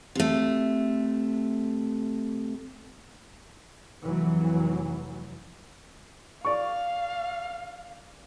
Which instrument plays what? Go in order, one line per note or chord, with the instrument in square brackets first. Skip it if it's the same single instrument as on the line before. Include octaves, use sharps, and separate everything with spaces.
[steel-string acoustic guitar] C3 A3
[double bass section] F1 E3 F#3
[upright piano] D5 C#6 [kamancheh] F5